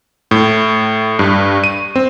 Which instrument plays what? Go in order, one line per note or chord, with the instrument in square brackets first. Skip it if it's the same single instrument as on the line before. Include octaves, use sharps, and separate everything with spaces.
[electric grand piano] A2
G2
D#7
C4